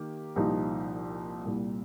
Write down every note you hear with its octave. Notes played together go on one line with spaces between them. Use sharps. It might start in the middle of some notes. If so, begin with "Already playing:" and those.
Already playing: D#3 A#3 G4
C2 A#2 F3 D#4 G4
C2 A#2 G3